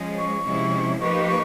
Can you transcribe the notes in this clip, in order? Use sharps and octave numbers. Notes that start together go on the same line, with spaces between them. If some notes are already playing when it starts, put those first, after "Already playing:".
Already playing: F3 G#3 C#4
C#6
C3 F3 G#3 C#4 E4
F3 A#3 D#4 G4 B4 C#6
C#6